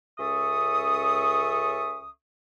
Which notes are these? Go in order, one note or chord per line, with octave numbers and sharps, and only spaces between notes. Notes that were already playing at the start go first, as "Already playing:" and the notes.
C#2 C#4 A4 E5 C#6 D#6